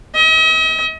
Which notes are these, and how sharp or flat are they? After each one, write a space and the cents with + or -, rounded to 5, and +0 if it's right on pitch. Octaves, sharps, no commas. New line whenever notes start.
D#5 +45